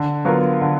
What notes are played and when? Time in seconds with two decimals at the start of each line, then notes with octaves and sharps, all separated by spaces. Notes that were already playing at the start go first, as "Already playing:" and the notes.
Already playing: D3
0.25 F#3 B3 F4 A#4
0.61 D3